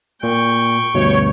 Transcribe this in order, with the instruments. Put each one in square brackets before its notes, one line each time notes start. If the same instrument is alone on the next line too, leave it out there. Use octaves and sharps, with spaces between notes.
[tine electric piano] A#2 [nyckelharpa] G5 C#6
[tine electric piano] D2 G2 B2 [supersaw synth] C#5